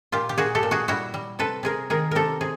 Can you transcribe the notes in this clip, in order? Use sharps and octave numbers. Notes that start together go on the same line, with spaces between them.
A#2 F4 G4
G4
A#2 F#4 G#4
G4 A4
A#2
F#4 G#4
G3 E4 F#4
G3
C3 A4 B4
C3 G#4 A#4
D#3 G#4 A#4
C3 G4 A4 A#4
C3 G#4